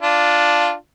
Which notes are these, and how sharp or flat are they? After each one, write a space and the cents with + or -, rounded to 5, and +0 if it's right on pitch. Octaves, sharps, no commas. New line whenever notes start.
D4 +0 F4 +0